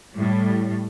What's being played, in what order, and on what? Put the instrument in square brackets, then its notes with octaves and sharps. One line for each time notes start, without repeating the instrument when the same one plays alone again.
[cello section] A2 G3